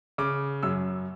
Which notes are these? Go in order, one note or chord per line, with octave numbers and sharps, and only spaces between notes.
C#3 D6
F#2 E6